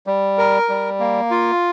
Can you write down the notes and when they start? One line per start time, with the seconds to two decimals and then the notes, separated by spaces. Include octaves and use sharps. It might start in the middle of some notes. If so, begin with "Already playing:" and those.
0.07 G3
0.38 A#4
0.69 G3
1.00 A#3
1.31 F4